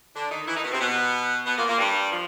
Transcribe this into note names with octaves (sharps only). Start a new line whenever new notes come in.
D3 D4
D#3 D#4
E3 E4
D#3 D#4
B2 B3
C3 C4
B2 B3
B2 B3
A#2 A#3
A#2 A#3
G2 G3
F3